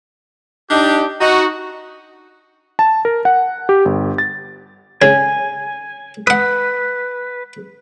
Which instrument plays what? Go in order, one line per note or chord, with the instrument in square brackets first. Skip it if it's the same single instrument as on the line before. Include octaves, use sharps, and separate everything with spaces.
[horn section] D4 D#4 G4
D#4 F#4
[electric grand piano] A5
A#4
F#5
G4
G1
A6
[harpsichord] C#3 [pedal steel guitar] G#5
[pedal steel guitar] B4 [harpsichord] F#5 D#6